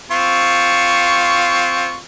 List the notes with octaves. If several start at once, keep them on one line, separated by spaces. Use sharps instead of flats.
C4 F4 C#6